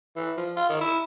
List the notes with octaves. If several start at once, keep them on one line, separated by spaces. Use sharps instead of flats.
E3
F3
F4
D#3
E4